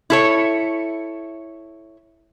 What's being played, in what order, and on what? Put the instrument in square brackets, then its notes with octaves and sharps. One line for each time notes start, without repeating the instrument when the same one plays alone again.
[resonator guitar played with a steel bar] E4 A4 C#5